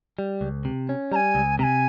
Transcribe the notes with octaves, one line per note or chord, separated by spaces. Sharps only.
G3
C#2
C3
C#4
G3 G#5 A#5
C#2
C3 G#5 A#5